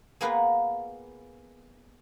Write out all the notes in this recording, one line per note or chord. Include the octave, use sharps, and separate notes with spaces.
G#3 A#3 B3 F4 B4 F#5